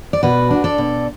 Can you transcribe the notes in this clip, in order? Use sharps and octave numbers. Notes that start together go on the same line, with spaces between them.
D5
B2 F#4 B4
D4
A4 D5
B2